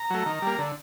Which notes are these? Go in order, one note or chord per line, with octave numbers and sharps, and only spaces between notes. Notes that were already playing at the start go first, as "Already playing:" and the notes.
Already playing: A#5
F#3 A3
D#3
G3 A#3
D3